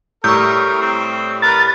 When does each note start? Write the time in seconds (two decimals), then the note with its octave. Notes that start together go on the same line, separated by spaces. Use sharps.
0.24 A2 G3 A#4 C#6 E6 G6
0.81 C4
1.42 A#4 B4 A6